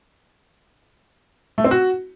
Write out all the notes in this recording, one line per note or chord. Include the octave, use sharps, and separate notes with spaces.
A3
C4
F#4